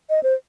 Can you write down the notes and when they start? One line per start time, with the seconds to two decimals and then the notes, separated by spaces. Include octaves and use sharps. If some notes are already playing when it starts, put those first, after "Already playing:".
0.10 D#5
0.23 C5